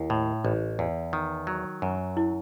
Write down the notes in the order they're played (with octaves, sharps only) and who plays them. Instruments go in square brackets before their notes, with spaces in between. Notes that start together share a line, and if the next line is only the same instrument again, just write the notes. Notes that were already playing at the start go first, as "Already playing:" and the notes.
Already playing: [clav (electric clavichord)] D#2 [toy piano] E4
[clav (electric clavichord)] A2
A1
E2
D#3
F#3
F#2
[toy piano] E4